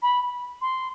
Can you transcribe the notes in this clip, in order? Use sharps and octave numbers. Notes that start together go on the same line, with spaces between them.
B5
C6